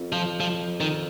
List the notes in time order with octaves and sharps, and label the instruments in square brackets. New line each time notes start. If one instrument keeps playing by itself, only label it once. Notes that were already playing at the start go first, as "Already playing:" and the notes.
Already playing: [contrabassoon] F2
[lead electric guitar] F3
F3
D#3